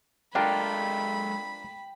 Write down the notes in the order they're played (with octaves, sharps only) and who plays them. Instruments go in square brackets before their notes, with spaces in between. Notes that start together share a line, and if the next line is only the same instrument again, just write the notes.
[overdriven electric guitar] G#3 A4 [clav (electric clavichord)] D4 F4 A#4 [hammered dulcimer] G5 [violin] B5